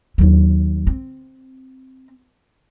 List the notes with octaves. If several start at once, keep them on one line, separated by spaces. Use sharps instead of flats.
D#2 F#3
C4